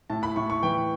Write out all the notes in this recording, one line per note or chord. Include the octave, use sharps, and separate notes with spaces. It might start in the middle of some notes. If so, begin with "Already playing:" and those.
A2 A5
B5
A2 C#6
C#6
E3 G5